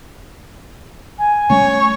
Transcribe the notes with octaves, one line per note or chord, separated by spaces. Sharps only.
G#5
G3 A3 C#4 C#5